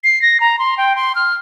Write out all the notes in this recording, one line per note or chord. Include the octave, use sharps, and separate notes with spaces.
C7
A#6
A#5
C6
G5
C6
F6